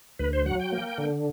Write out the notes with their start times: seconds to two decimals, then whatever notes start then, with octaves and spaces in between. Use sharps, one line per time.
0.19 D2 B4
0.33 C5
0.46 F#3 F#5
0.59 G5
0.72 A#3
0.98 D3